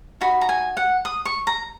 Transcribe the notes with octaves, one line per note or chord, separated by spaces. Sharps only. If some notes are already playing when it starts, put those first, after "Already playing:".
D#4 F#4 B5
A#5
G#5
F#5
D#6
C#6
A#5